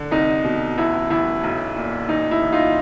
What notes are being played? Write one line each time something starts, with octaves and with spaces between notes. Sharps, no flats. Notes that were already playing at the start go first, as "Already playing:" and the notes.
Already playing: D3
C2 D#4
B2
A1 E4
A1 E4
B1
A#2
A1 D#4
E4
A1
D#4 F4